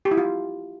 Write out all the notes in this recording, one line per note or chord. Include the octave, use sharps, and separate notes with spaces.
G4
E4
F4